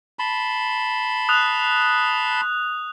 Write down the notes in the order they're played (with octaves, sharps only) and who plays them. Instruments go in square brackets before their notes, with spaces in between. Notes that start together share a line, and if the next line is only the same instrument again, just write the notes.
[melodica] A5 B5 C6
[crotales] D#6 F#6 F7